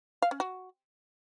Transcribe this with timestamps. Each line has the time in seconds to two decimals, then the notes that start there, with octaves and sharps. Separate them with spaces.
0.22 F5
0.31 C#4
0.40 F#4